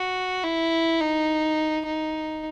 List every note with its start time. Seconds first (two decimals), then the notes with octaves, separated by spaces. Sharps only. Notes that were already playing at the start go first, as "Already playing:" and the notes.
Already playing: F#4
0.44 E4
1.01 D#4
1.86 D#4